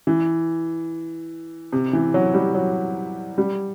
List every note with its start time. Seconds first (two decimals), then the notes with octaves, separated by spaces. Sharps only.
0.07 E3
1.72 C3
1.93 E3
2.14 F#3
2.34 G3
2.55 F#3
3.38 G3